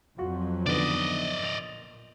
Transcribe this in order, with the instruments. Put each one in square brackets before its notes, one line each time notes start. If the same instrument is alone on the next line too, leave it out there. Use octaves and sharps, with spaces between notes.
[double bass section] F2 F3 F#3 [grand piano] F4 F#4
[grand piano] D3 D#3 B3 [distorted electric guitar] D5 D#5
[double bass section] A#2 [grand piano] A6 F7